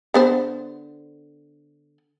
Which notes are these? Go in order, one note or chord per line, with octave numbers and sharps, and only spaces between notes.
D3 B3 C5